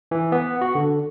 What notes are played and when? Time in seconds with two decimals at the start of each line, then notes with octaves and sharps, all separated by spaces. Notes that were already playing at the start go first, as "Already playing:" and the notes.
0.11 E3
0.32 B3
0.61 F#4
0.75 D3